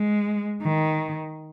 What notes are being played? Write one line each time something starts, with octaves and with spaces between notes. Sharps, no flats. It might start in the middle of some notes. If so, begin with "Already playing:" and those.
Already playing: G#3
D#3